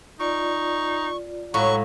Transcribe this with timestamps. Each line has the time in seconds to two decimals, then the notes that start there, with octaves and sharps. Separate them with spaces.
0.20 D#4 F4 D5 C#6
1.54 A2 F#3 G#3 F5 C#6